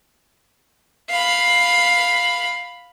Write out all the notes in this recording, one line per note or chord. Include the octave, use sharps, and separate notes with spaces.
F5 B5